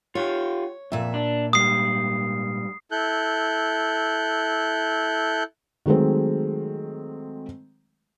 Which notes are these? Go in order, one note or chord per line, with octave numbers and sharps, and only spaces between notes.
F4 G4 C#5
F2 A#2 E5
D4
G#2 G3 D#6 C7
E4 A4 F#6 G6
D#3 F#3 G#3 A3 C4